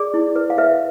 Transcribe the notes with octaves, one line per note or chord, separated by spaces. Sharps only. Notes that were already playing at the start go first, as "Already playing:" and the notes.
Already playing: G#4 D5
E4
B4
F5
B4 E5